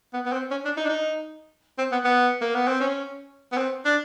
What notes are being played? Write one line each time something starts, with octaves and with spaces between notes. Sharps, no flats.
B3
B3
C4
C#4
D4
D#4
D4
D#4
C4
B3
B3
A#3
B3
C4
C#4
B3
C4
D4